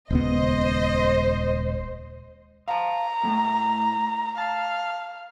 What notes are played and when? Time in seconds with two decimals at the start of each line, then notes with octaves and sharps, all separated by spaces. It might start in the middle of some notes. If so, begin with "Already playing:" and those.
0.10 D#1 C#2 B3 C5 D#5
2.68 F5 A5 A#5
3.24 A2 A3
4.38 F5 A5